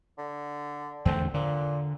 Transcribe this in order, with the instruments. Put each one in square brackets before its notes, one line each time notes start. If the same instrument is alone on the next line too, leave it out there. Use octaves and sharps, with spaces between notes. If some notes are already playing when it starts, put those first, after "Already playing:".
[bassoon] D3
[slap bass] E2 D3 A3 [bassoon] C4
[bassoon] A#2 [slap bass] D3